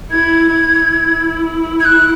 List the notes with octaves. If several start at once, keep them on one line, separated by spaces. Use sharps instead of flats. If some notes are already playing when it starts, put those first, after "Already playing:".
E4 G#6
E4
G#6
F#6